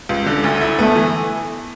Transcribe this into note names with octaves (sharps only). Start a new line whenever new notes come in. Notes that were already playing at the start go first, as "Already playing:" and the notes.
C#2
D3
D2
E4
A3 B3
E3